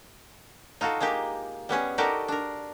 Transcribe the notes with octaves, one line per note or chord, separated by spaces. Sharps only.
D#4 F4 F#4 A4
G#3 A#3 D#4 G4
G3 B3 C#4 G#4
D#4 F#4 G4 A4 A#4 D5
D4 A#4